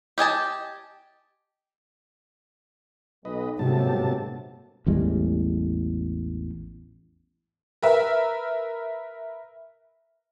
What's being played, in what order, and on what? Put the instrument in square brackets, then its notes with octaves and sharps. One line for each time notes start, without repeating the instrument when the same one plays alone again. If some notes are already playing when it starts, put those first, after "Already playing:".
[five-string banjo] G4 D#5 G#5 A5
[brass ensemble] B1 [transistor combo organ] B4 D#5
[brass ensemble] G1 F#3 A#3 [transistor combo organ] G#2 G3 A5 [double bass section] C3
[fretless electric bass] A1 E2 G3 G#3
[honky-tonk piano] A#4 B4 E5